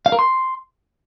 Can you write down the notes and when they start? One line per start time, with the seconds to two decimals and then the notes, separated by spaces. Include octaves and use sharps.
0.06 F5
0.12 A#4
0.19 C6